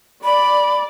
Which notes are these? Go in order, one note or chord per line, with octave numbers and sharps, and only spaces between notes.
D5 B5